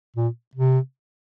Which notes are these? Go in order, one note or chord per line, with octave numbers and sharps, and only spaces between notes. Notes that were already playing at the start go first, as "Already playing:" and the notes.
A#2
C3